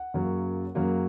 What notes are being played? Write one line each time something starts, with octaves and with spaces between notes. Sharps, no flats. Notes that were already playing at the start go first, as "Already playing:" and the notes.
Already playing: F#5
F#2 C#3 F#3 A#3
F#2 C#3 F#3 A#3